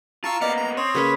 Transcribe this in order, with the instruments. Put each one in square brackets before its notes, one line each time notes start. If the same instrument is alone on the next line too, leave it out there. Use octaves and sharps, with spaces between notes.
[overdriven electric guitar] F4 [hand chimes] F5 A#5 [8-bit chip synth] A5 C#6 E6
[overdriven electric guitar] A#3 B3 [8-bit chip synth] D5 F6 C#7 [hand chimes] D#5
[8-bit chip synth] A#5
[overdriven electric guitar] C4 [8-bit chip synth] C#5 [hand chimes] C6 D#6
[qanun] C#3 A#3 C#4 [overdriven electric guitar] B4